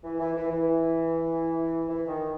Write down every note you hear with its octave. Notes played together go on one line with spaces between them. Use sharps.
E3
E3
E3
E3
E3
D#3